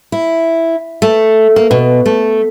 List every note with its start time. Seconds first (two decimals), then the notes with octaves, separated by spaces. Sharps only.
0.12 E4
1.02 A3
1.56 A#3
1.71 B2
2.06 A3